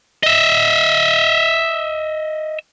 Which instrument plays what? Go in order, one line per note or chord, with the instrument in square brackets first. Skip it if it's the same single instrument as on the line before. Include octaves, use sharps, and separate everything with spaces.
[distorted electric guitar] D#5 E5